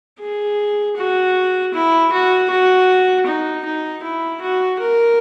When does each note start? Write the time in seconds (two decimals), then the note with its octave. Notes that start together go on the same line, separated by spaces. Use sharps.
0.20 G#4
0.97 F#4
1.74 E4
2.12 F#4
2.50 F#4
3.26 D#4
3.65 D#4
4.03 E4
4.41 F#4
4.80 A#4